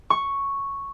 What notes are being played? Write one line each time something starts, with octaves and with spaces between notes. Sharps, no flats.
C#6